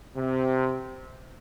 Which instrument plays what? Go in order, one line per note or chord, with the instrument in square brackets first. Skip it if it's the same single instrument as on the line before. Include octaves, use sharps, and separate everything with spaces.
[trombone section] C3